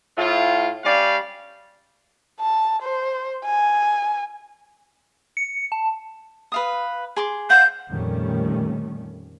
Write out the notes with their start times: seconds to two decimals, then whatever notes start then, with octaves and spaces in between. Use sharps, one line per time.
0.18 A2 F4
0.84 G3 C#4 D5 F5
2.40 A5
2.83 C5
3.45 G#5
5.37 C#7
5.72 A5
6.52 B4 F5 D#6
7.16 G#4 C6 D6
7.50 F5 F#5 G6
7.91 F2 A#2 D#3 G3 A3 C#4